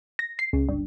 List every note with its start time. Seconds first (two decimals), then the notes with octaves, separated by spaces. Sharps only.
0.19 A#6
0.39 C7
0.53 C#2
0.69 G1